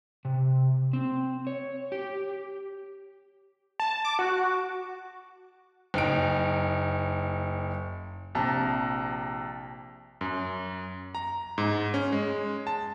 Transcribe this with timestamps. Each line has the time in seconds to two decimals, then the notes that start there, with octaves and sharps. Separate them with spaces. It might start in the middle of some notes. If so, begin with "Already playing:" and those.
0.25 C3
0.93 C4
1.47 C#5
1.92 G4
3.80 A5
4.05 D6
4.19 F#4
5.94 F#1 D#4 D7
8.35 A#1 C3 A5 A#5
10.21 F#2
11.15 A#5
11.58 G#2
11.94 C#4
12.12 G#3
12.67 A5